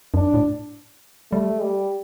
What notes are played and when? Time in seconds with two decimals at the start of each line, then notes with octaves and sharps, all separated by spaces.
0.14 F#2 D4
0.34 A2
1.32 G3 A3
1.61 G3